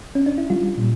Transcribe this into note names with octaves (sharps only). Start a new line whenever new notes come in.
C#4
D4
E4
G3 F4
A#2